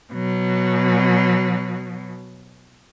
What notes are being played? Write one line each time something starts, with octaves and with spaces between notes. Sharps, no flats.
B2 F#3